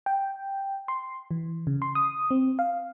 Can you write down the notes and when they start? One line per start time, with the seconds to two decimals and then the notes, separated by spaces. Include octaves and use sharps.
0.06 G5
0.88 C6
1.31 E3
1.67 C#3
1.82 C6
1.95 D#6
2.31 C4
2.59 F5